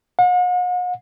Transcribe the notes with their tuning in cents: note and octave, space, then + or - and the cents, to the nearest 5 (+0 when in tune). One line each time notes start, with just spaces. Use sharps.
F#5 -45